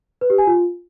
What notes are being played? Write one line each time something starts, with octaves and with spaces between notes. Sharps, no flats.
B4
G4
G#5
F4